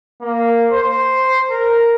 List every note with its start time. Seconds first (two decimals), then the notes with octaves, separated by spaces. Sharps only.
0.21 A#3
0.72 C5
1.51 A#4